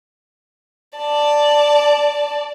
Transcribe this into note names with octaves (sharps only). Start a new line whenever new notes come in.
D5 A5